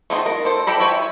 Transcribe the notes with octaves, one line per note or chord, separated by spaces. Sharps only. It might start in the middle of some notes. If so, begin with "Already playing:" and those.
A3 C4 D#4 F4
A#4
A4 C5
E4 G4 A4 A#5 B5
E4 C#5 G5 G#5